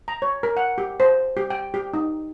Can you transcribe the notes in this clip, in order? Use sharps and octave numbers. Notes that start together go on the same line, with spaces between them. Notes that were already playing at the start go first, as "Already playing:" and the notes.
A#5
C#5
A#4
F#5
G4
C5
G4
G5
G4
D#4